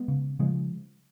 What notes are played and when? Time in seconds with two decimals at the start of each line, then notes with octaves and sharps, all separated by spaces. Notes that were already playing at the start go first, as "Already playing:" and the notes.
Already playing: G#3 B3
0.08 C#3
0.39 C#3 F3 G#3